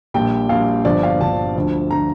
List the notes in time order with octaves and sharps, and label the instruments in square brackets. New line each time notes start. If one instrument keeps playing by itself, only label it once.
[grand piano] A#1 A#2 G3 G5
A#1 A#2 G3 F5
G1 G2 F3 D5
F5
G1 G2 F3 A5
D2 D3 F3
D3 F3 A#5